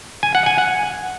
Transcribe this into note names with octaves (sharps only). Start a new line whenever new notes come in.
G#5
F#5
G#5
F#5